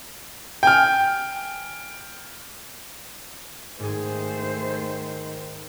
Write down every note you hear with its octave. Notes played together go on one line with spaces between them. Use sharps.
G5 G#5 F6
G#2 D#3 A3 G#4 C5